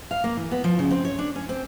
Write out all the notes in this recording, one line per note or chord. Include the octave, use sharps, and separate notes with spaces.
F5
A#3
E3
B3
F3
C#3
C4
C#5
D4
C#4
C4